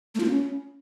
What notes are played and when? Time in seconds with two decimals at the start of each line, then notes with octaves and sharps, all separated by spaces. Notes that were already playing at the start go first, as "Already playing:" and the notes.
0.15 A3
0.20 F4
0.25 A#3
0.30 C#4